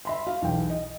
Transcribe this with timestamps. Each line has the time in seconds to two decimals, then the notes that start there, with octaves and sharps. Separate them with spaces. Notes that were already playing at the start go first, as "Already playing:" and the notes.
0.05 E5 B5 C6
0.27 F#4 F5
0.42 B1 E2 G5
0.70 D#5